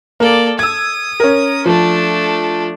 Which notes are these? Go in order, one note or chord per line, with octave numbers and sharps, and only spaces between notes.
A#3 A4 D5
D#6 E6 G#6
C#4 A#4
F3 A3 D4